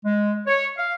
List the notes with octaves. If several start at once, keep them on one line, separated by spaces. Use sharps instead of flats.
G#3
C#5
F5